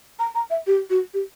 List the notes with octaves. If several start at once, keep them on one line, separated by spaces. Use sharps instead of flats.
A#5
A#5
E5
G4
F#4
G4